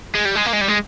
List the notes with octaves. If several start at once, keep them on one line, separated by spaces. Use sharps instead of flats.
G#3
G3
G#3
A#3
G#3
G3
G#3